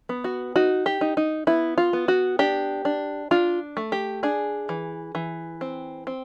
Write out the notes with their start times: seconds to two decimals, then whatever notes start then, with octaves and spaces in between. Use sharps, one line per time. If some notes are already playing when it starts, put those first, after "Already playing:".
0.09 B3
0.24 F#4
0.56 D#4 F#4
0.86 G4
1.01 D#4
1.17 D#4
1.47 B3 E4
1.78 F4
1.93 B3
2.08 F#4
2.39 D4 G4
2.85 D4
3.31 D4 F4
3.77 A3
3.92 G4
4.23 D4 G#4
4.69 E3
5.15 E3
5.61 C4
6.07 C4